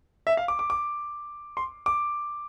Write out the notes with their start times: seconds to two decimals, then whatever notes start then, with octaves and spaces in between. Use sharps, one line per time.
0.27 E5
0.37 F5
0.48 D6
0.59 D6
0.70 D6
1.57 C6
1.86 D6